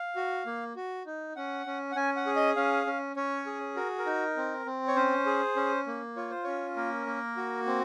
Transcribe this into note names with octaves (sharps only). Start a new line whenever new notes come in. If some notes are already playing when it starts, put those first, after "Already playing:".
Already playing: F5
F#4
A#3
F#4
D#4
C#4 F#5
C#4
F#5
C#4 G#5
F#5
G#4
D#5
C#4 F5
C#4
C#4 C#5
G#4
F#4 A#4
A#4
D#4
C4
C4
C#5
C#4 C5
G#4
C#4
A#3
F4 C#5
C5
C#4 C#5
A#3 A#4
A#3
F#4
C4